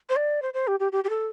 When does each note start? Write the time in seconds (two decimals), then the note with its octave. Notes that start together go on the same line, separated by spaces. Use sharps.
0.09 C5
0.16 D5
0.42 C5
0.54 C5
0.67 G4
0.80 G4
0.92 G4
1.04 G4
1.09 A4